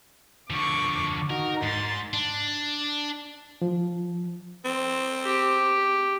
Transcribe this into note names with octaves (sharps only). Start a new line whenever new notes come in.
D3 F3 C#6 D6
D#4 F#4 A#4
G#2 C6 A6
D4
F3
C4
G4